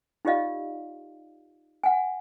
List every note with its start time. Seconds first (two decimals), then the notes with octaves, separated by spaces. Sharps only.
0.25 D#4 F4 G4 D5 D#5 F5
1.84 F#5 G#5